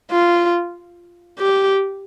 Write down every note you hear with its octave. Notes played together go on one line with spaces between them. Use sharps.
F4
G4